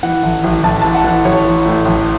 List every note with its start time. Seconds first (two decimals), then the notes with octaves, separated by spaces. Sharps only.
0.03 E3 F#5
0.23 A1
0.44 A1
0.63 A1 A5
0.82 A5
0.85 E3
0.94 F#5
1.04 E3
1.25 A1 C#5
1.45 E3
1.66 A2
1.85 A1